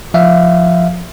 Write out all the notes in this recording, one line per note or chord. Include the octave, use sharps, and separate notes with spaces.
F3 E5 F5